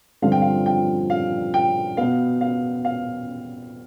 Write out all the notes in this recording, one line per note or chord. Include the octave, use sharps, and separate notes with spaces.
G2 D3 F3 C4 F5
G5
F5
G5
F5
G5
B2 B3 F5
F5
F5